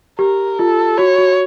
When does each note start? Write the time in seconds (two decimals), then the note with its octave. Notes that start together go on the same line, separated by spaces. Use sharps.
0.19 G4 A#4
0.59 F4 A4
0.98 F#4 C#5
1.18 F#4